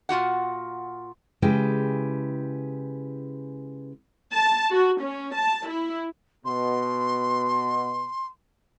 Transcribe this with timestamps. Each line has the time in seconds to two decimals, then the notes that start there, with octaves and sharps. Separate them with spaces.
0.09 A#2 F4 F#4 F#5
1.42 C#3 G#3 E4 G4 B4 G5
4.34 A5
4.71 F#4
5.01 C#4
5.34 A5
5.67 E4
6.45 B2 C6